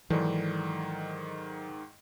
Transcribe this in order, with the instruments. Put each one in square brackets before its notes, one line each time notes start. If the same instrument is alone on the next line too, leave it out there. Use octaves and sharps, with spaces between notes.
[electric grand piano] G#2 D#3 [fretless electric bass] E3 [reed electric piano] F#3 A4 D5